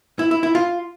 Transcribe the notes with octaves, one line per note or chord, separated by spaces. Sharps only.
E4
E4
E4
F4